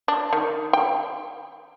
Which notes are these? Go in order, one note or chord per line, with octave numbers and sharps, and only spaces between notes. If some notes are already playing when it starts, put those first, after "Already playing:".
D4
D#3
G5